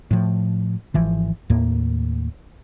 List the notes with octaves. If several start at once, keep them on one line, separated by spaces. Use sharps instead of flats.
A2 F3
G#1 E3 F3
D#2 A2 A#3